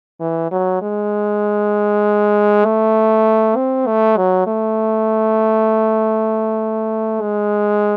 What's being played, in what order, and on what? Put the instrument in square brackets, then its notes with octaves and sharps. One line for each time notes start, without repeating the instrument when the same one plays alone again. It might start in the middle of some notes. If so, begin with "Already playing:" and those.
[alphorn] E3
F#3
G#3
A3
C4
A3
F#3
A3
G#3